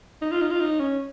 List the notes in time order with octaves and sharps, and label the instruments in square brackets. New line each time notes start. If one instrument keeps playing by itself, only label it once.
[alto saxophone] D#4
F4
D#4
F4
D#4
C#4